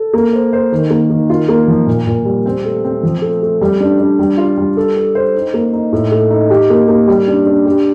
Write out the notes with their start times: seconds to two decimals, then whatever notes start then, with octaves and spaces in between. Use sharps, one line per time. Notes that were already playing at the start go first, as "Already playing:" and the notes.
Already playing: A4
0.13 A#3
0.33 C5
0.53 C5
0.72 D#3
0.90 A#3
1.10 D#3
1.30 F4
1.49 A#3
1.68 F3
1.87 A#2
2.07 A#2
2.25 G3
2.46 C4
2.65 A3
2.84 C4
3.03 F3
3.22 A3
3.42 A3
3.61 G3
3.80 D4
4.00 D4
4.19 G3
4.37 F4
4.58 G3
4.77 A4
4.96 A4
5.15 C5
5.35 D#4
5.54 A#3
5.73 D#4
5.93 A2
6.11 A3
6.31 D#4
6.50 G4
6.70 A#3
6.88 A#3
7.08 G3
7.28 D4
7.46 D4
7.66 G4